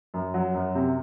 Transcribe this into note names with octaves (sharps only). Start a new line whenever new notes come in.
F#2
F#3
F#2
C3